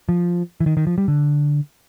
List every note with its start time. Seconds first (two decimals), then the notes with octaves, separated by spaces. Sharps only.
0.09 F3
0.60 E3
0.66 D#3
0.77 D#3
0.87 F3
0.98 G3
1.08 D3